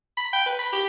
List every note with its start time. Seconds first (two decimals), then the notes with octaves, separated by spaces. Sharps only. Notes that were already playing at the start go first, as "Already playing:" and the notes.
0.17 B5
0.33 G5
0.46 B4
0.59 B5
0.73 G4